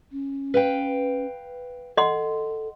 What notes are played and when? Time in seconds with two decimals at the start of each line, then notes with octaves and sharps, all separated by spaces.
0.12 C#4
0.54 B4 F5 G5
1.97 A4 D#5 F#5 C6